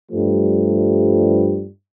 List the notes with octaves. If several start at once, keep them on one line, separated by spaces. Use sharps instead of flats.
G2 F3 G3 A3